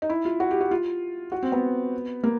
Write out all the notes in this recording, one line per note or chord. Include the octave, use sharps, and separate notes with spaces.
D#4
E4
F4
F#4
G4
F#4
F4
F#4
C4
B3
A#3